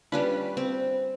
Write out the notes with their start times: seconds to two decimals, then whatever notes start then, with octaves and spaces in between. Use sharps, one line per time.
0.12 G3 C#4 D4 F4 B4
0.57 C4